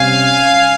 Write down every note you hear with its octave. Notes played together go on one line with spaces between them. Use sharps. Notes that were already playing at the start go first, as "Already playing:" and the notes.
Already playing: C3 G3 C#4 F5 G#5